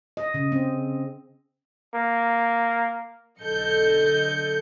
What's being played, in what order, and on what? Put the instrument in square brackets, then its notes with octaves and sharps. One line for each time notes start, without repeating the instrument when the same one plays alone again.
[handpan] D#5
C#3
C4
[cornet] A#3
[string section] B1 D3 A4 D#5 G6 C#7